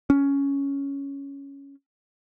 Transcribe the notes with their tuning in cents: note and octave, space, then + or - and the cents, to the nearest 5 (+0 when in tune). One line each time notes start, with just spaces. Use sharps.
C#4 +5